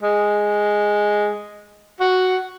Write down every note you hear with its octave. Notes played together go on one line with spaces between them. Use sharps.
G#3
F#4